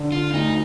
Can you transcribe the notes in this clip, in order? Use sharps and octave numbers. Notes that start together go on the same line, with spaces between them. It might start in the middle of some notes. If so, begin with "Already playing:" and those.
Already playing: D3
F4
D2 D#4